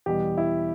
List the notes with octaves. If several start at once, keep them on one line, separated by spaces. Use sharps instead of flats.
E2 B2 G3 G4
E4